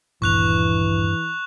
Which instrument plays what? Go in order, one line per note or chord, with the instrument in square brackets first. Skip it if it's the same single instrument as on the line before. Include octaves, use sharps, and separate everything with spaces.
[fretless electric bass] D#1 [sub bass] G2 [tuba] E3 [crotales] C#6 F#6 F7